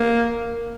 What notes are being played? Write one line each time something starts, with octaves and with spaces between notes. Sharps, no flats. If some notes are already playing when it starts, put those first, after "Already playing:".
Already playing: A#3